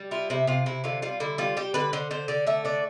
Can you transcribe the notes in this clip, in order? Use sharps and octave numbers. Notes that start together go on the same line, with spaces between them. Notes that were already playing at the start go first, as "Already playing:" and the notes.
Already playing: G3
E4 F4
C3 E4
C3 F4
C3 E4
D3 F4
G3 F4
D3 E4
G3 F4
G3 G4
D3 B4
D3 C5
D3 C5
D3 D5
A3 E5
D3 D5